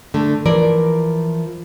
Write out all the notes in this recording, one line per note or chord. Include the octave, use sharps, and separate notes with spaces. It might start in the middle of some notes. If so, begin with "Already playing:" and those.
D3 A3
E3 F3 A#4 D5